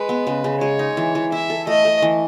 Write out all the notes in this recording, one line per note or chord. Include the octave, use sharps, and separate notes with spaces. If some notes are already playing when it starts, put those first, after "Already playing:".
Already playing: G#3 B4
B3
C#3
C#3
G#3 C#5
D#4
E3
E3
E4 E5
A4
A3 D#5
A3
E3